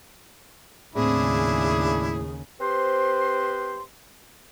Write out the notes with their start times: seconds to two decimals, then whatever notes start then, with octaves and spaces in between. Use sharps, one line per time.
0.95 D#2 A2 C#3 C4 D4 E4 G#4
2.60 C4 G4 B4 C5 C6